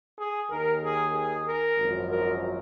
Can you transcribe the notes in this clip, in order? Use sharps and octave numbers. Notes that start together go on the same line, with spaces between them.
G#4
D#2 D#3 A#4
G#4
G#4
A#4
G#1 F#2 F3
A#4